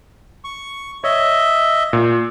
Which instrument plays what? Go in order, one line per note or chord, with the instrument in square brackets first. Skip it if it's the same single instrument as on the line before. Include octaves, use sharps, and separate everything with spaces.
[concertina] C#6
[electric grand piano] C#5 [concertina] D#5 E5
[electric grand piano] A#2